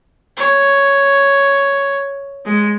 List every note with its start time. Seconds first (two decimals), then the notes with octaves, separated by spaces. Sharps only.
0.37 C#5
2.45 G#3